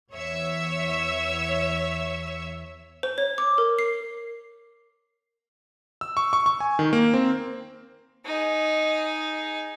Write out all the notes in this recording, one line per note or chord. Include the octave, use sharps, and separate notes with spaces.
E2 C#5 E5 E6
C5
C#5
D6
A#4
C7
E6
C#6
C#6
C#6
G#5
D#3
A#3
C4
D#4 G#4